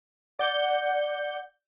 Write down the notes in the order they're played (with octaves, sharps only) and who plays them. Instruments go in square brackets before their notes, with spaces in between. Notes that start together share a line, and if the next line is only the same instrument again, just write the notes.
[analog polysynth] D5 G6 [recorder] F#5